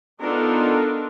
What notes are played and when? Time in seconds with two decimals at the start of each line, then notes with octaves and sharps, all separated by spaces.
0.21 B3 D4 D#4 F4 A4 A#4